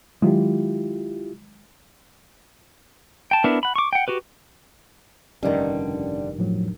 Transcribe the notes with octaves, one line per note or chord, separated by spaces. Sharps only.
D#3 F#3 G#3 E4 F4 G4
G5 A5
B3 D4 E4 A#4 B4
F#5 B5
C#6 D6
F#5 G5
F#4 G4 B4
F1 G2 D3 D#3 G3 C#4
A2 F3 F#3